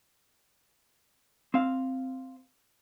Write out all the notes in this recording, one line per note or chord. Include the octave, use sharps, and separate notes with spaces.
C4 F5